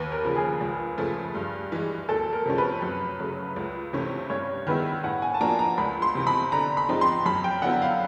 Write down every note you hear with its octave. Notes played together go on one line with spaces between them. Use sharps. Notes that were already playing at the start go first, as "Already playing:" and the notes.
Already playing: D#2 B4
A#4
C#3 F3
G#4
C#2
C#3 F3 A3
G2
E3 G#3
D2 A4
A#4
C3 F3 G#3 C#4
B4
F#2
C#3 F#3 A3
C#2
C3 E3 A3 C#4
G2 C#5
D#3 G#3 B3 E4 B4
A2 F#5
G#5
A5
F3 A#3 D4 F#4 A#5
A#5
C#2 B5
C6
C3 E3
B5
D3 A#5
B5
F3 G#3 C4 D#4
C6
F#2 B5
G5
D3 F#3 B3 E4 F#5
F5